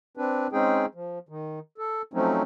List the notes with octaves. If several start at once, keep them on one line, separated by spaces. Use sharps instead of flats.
C4 D4 B4
G#3 C4 C#4 D#4 G#4 G5
F3
D#3
A4
F3 F#3 A3 C4 C#4 D#4